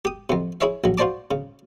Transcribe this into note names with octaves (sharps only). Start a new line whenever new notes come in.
G4 D#6
F2 C3
E4 G#4 C#5 E5 F5
A#1 F#3
F4 F#4 C5 D5 A5 D6
C#3